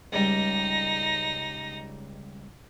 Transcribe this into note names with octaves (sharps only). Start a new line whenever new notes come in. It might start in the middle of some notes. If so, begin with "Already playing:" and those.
C#2 G3 D#4 A#6